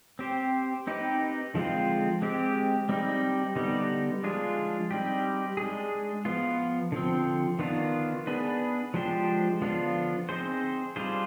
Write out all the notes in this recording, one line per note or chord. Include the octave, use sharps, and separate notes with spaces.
C4 G4 C5
C4 D#4 G4 B4
D3 F3 G#3 C4 F4
G#3 C4 G4
G3 C4 D#4
D3 G3 B3 D#4
F3 G#3 D4 F4 G#4
G3 C4 D#4 G4
G#3 D4 G#4
F3 B3 F4
D3 F3 C4
D#3 B3 D4 F4
B3 D4 G#4 B4
F3 G#3 D4 G4 C5
D3 F3 B3 D4 F4
C4 D#4 G#4 C5
G3 D4 F4 G#4 C5